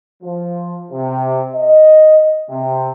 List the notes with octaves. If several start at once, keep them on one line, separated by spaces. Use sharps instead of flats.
F3
C3
D#5
C3